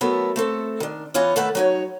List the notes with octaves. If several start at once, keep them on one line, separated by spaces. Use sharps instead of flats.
F#3 A3 B3 E4 A4 A#4
A3 C4 A4
D#3 D4
E3 B3 F4 C#5 D#5
D#3 A3 A4 B4 F#5
F#3 D#4 C#5